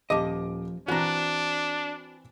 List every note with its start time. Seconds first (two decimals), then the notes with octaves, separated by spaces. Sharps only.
0.10 D#1 F3 D#5 D6
0.88 E3 C4 D4 F#4 A#5